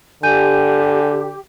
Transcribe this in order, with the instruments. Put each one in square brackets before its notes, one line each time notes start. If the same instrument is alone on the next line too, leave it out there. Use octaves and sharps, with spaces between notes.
[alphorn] D3 [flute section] G4 [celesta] G#5 G6 D#7